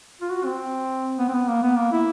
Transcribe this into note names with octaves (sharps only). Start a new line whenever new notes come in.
F4
F#4
C4
B3
C4
B3
A#3
B3
A#3
E4